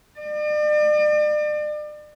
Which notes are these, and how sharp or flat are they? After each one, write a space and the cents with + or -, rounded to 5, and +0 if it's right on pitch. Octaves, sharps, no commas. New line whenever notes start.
D5 +40